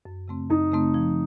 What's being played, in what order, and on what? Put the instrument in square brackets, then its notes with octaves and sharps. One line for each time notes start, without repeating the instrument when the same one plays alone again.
[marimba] F#2
C#3 A3 C4
[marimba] F#2 [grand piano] D#4
[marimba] C#3 A3 C4
F3